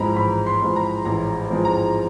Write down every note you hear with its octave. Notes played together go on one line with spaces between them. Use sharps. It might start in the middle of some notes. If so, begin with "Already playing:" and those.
Already playing: A1 G#2 F3 G#3 C4 A#5 B5
A1 B5
C6
G#2 F3 G#3 C4
A#5
A1 A#5
G#2 F3 G#3 C4
A#5